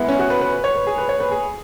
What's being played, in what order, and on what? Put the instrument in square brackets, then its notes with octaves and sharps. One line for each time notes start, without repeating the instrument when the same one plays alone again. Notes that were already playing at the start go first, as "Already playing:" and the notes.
Already playing: [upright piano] G#3 B3 E4
C#4
F#4
B4
B4
B4
C#5
B4
G#4
B4
C#5
B4
G#4